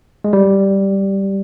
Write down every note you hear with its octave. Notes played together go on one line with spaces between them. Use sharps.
G#3
G3